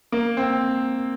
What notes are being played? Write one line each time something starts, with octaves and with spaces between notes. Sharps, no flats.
A#3
C4